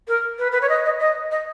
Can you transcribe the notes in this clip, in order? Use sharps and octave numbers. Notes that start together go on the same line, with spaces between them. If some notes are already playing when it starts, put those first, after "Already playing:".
A#4
B4
B4
C#5
D#5
D#5
D#5
D#5